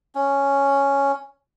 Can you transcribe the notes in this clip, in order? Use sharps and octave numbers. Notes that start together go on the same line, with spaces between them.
C#4